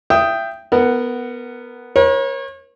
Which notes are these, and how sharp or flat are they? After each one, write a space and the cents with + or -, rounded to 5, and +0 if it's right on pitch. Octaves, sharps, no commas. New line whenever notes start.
E5 +30 G5 +0 D#6 +0
B3 +0 A#4 -20 F#5 +10
A#4 +45 C#5 -30